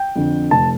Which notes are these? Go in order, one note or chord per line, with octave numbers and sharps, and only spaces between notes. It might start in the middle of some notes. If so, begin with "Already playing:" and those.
Already playing: G5
F2 D3
F1 A5